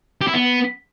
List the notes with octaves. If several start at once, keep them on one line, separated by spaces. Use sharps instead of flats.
G4
E4
B3